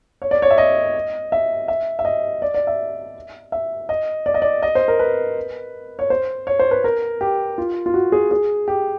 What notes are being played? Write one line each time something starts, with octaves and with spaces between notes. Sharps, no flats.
C#5
D5
C#5
E5
D#5
E5
E5
E5
D#5
D5
D5
E5
E5
D#5
D5
D#5
D5
D#5
C5
A#4
B4
C#5
C5
C#5
C5
B4
A#4
G4
F4
F4
F#4
G#4
G#4
G4